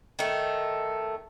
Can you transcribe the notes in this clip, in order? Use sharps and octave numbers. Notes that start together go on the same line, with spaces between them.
D#3 A3